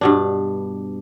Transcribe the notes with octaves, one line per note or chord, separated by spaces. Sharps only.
G2 B2 D4